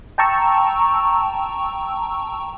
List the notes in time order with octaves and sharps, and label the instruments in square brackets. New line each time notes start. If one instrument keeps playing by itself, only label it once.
[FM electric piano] G5 A5 A#5 C#6 E6